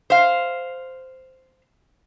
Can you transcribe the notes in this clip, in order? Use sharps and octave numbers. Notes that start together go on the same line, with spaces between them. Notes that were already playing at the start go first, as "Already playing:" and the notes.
C5 F5